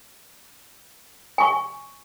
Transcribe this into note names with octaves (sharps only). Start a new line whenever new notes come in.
G#5 C#6